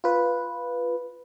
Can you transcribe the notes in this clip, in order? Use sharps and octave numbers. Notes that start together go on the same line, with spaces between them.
F4 B4